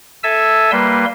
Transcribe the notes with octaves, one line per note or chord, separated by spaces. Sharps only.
A4 E5 G#5 A5 E6
G3 A#3 B4 C6